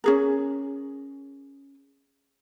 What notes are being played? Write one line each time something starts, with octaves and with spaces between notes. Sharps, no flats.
C#4 G#4 A#4